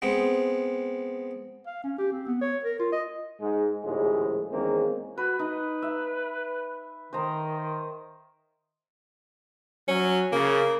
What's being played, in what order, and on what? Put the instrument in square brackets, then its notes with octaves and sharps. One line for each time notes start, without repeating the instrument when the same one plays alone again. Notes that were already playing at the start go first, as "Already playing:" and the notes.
[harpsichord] G#3 B3 C4
[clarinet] F5
C#4
G4
C4
B3
C#5
A#4
F4
D#5
[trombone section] G#2 G#3
A#1 D#2 A2 C#3 F3 G#3
E2 D#3 G#3 A#3 C4 C#4
[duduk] F#4 [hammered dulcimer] B4
[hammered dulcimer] D#4 [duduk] B4
[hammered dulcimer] E5
[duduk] D#3 [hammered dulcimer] C5 D#5 A#5
[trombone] F#3 [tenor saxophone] C#4
[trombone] C#3 [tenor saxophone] A#3